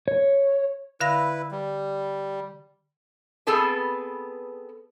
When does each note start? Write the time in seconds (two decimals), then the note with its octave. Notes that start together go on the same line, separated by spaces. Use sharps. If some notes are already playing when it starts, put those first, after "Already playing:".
0.08 C#5
1.01 D3 E4 B4 F5 A#6
1.51 G3
3.47 B3 C4 G#4 A4 B4